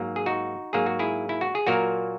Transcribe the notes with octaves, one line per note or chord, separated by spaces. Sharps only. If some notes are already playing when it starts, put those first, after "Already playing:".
Already playing: G#2 F#3 A#3
G#4
D#4 F#4
G#2 F#3 A#3 G#4
F#4
E4 G#4
E4
F#4
G#4
A#2 F#3 A#3 F#4 A#4